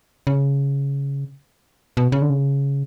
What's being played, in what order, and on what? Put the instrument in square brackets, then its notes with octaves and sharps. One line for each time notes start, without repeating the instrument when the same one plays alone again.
[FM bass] C#3
B2
C#3
D3
C#3